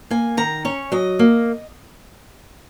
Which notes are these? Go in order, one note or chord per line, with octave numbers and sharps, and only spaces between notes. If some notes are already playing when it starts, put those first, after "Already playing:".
A#3 G#5
D#3 A#5
C#4 C#5
F#3 D#5
A#3